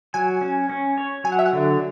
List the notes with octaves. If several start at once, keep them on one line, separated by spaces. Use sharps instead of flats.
F#3 G#5
C#4
C#4
C#5
F#3 G#5
F#5
E5
F#5
D3